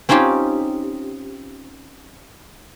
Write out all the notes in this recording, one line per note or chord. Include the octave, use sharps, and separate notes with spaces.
C4 C#4 D#4 F4 G4